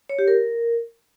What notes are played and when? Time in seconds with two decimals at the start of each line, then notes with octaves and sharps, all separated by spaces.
0.09 C#5
0.19 G4
0.28 A#4